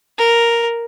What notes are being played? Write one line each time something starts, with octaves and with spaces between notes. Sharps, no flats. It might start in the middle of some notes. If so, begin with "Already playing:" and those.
A#4